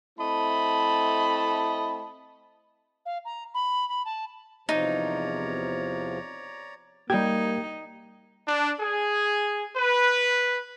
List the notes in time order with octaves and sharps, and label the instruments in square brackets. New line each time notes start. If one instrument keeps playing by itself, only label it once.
[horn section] A3 C4 E4 D#5 A5 B5
[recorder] F5
A#5
B5
B5
A5
[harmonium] E2 C3 F3 [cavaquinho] D#4 [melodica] C#5 D5 A#5
[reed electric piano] G3 G#6 [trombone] A#3 [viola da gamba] D#4 [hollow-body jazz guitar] G4
[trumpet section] D4
G#4
B4